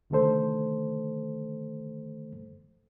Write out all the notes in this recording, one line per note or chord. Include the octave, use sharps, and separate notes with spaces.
C2 D3 D#3 A3 A4 C5